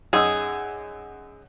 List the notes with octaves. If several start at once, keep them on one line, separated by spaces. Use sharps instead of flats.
F#2 D#4 G#4 E6